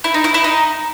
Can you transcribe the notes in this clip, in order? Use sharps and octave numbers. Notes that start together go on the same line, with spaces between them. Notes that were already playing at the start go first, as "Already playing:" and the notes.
E4
D#4
E4
E4
D#4